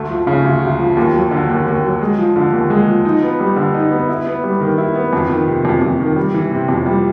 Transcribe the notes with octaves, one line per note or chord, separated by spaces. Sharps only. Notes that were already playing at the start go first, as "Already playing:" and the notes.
Already playing: D2 A3
F3
C#3
D2
D2
F3
D#2
F#3
D3
D#2
D#2
F#3
G#3
F3
D3
D#2
G#3
F3
D#4
B3
G3
D3
D#4
B3
E4
B3
G3
D#3
E4
B3
F2
D#3
C3
F2
F2
D#3
G3
E3
C3
F2
G3